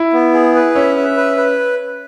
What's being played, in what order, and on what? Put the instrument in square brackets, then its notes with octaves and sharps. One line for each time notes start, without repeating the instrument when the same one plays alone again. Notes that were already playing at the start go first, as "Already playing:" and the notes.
Already playing: [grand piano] E4
[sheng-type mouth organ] B3
G#4
B4
[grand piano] C#4 [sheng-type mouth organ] E5
[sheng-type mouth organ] E5
B4
B4